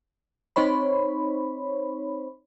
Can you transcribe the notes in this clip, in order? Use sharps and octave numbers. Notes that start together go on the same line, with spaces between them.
C4 D#4 C5 C#5 B5